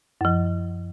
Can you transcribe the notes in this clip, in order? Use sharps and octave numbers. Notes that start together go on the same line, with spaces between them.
F#2 F3